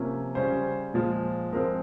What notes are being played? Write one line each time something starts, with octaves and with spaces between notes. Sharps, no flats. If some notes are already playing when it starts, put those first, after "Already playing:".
Already playing: C3 F3 A#3 C#4
C#3 G3 C#4 C5
A#2 F3 G#3
F3 G#3 C4 A#4